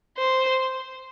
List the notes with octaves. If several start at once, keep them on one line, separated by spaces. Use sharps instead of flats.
C5